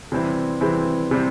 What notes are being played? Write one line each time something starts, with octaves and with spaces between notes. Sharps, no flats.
C3 E3 G3 C4 E4
C3 E3 G3 C4 E4
C3 E3 G3 C4